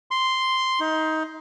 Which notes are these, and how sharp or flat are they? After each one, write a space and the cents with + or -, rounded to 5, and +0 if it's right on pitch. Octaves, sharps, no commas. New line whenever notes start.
C6 -5
D#4 +20